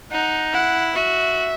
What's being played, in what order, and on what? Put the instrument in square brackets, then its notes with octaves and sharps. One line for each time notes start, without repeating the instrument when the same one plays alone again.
[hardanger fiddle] D#4 [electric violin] F#5
[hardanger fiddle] E4 [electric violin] F#5
[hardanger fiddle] F#4 [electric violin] E5